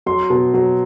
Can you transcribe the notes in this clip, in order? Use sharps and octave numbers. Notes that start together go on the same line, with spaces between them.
F#3 C6
B2
F#3